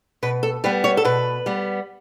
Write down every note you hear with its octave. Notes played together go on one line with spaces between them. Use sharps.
B2 B4
A4
G3 B3 B4
C#5
A4
B2 B4
G3 B3